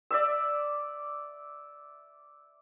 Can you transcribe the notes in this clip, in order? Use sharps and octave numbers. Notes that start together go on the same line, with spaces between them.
D5 E5 E6